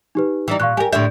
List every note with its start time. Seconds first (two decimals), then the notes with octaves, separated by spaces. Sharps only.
0.15 D#4 G4 B4
0.48 E3 G3 D#4
0.60 A#2 F5 C#6 F#6
0.77 G4 A#4 G#5
0.93 A2 D3 E5 G6